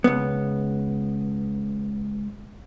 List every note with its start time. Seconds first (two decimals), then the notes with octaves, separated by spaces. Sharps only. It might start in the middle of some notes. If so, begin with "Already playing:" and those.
0.04 C#2 B3